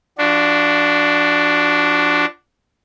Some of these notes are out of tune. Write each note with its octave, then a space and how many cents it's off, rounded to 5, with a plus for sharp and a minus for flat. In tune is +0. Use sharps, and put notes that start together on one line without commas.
F3 -15 D4 +0 F#4 +15